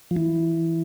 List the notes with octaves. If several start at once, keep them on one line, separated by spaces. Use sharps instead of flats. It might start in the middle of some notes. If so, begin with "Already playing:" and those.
F3
E3